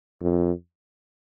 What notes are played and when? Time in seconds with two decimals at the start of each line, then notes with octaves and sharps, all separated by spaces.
0.22 F2